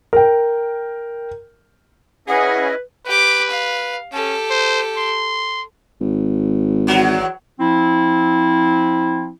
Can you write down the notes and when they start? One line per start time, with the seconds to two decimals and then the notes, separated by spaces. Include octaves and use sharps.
0.13 A#4 G5
2.28 C#4 E4 G#4 B4 D#5 F#5
3.06 G4 B4 D6
3.50 F5
4.13 C#4 G4 A4
4.50 C5
4.97 C6
6.01 G#1
6.87 E2 F#3
7.60 F3 C4 E4